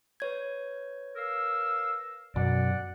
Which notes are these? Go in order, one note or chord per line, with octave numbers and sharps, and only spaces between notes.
B4 C#5 G#6
A#4 F5 E6
F#2 B2 D5 F#5